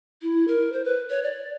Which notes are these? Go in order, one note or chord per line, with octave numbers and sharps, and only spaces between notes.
E4
A#4
C5
B4
C#5
D5